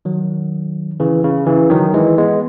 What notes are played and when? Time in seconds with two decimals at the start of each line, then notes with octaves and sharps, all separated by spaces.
0.05 D#3 F#3
1.00 C#3 E3
1.24 C#3
1.47 C#3 E3
1.70 D#3 F#3
1.94 E3 G#3
2.18 G#3 B3